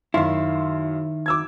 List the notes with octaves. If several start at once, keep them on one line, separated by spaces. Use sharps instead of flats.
F#2 D#3 E4 F5 C6
D6 E6 G#6